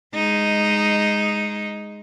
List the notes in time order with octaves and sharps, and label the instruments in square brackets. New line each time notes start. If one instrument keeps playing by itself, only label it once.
[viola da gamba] G#3 D#4